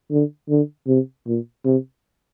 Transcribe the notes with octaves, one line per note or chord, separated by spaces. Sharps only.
D3
D3
C3
A#2
C3